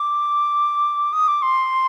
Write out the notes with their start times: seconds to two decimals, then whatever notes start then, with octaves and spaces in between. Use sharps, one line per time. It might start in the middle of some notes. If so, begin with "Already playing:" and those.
Already playing: D6
1.13 D#6
1.28 D6
1.42 C6